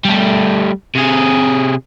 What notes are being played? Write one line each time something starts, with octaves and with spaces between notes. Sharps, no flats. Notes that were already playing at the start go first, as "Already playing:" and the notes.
G3 A3
C3 G#4